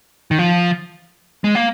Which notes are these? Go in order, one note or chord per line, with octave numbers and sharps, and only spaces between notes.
D#3
F3
G#3
A#3